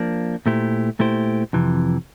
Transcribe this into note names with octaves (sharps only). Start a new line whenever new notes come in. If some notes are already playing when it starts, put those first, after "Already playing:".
Already playing: F3 A#3 D4
A#2 A3 E4 G4 C5
A#2 A3 E4 G4 C5
F2 C3 E3